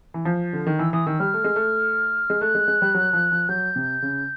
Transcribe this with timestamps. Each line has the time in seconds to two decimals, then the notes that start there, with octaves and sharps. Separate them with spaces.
0.14 E3
0.25 F3
0.53 D3
0.67 D#3
0.79 E3 E6
0.93 E3 D#6
1.06 D#3 E6
1.20 G3 F6
1.34 A3
1.44 G#3
1.56 A3
2.30 G#3
2.41 A3 F#6
2.55 G#3
2.68 G#3
2.82 G3
2.94 F#3
3.13 F3
3.32 F3
3.49 F#3 G6
3.76 C3
4.02 C#3